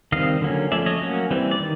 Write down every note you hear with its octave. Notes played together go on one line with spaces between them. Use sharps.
D#3 G3 C4 D#5 F5
D3 F#3 A#3 C#4
F3 A3 C#4 D5 E5
C#5 D#5
F#3 A#3 C#4
E3 G3 C4
D5
D#3